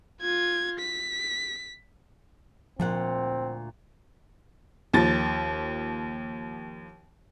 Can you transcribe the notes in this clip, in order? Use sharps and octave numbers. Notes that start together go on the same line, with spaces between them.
F4 G#6
B6
D2 A#2 F3 C4 F#5
D#2 F3 A6